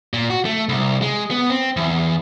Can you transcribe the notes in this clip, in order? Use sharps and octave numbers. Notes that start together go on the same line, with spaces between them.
A#2
F#4
A3
C2
G#3
B3
C4
E2